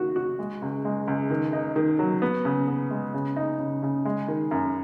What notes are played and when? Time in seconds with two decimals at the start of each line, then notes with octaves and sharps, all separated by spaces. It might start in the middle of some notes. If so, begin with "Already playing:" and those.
Already playing: D#3 F#4
0.16 F#4
0.39 G#3
0.62 C#2
0.85 G#3
1.07 C#2
1.30 D#3
1.53 D#4
1.76 D#3
1.99 F#3
2.22 B3
2.45 C#3
2.68 B3
2.91 G#3
3.14 C#3
3.36 D#4
3.59 C#3
3.83 C#3
4.05 G#3
4.28 D#3
4.51 F#2